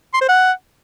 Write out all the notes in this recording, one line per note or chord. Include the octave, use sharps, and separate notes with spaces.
C6
C5
F#5